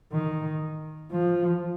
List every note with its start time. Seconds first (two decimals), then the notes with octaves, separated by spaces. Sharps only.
0.12 D#3
1.11 F3